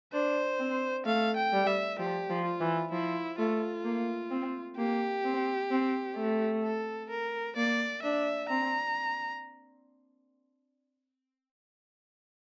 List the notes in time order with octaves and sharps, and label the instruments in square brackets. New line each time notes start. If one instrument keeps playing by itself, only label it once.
[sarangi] D4 [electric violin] C5
[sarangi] C4
[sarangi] A3 [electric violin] F5
[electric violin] G5
[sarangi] G3
[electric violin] E5
[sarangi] F3 [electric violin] G4
[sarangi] F3
[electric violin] F4
[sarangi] E3
[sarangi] F3 [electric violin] E4
[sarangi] A3 [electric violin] F4
[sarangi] A#3
C4
[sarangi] A#3 [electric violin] G4
[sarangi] C4
C4
A3
[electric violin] A4
A#4
[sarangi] A#3 [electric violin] D5
[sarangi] D4 [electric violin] E5
[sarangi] C4 [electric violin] A#5